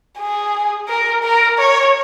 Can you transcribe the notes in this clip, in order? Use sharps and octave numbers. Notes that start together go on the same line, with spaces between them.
G#4
A#4
A#4
C#5